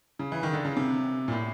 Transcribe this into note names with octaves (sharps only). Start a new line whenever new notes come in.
C#3
E3
D#3
D3
C#3
C3
A#2
A2